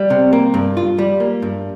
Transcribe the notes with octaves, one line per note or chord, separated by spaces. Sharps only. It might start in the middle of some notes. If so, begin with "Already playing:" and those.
Already playing: G3
C3
A#3
G2
F4
G3
A#3
G2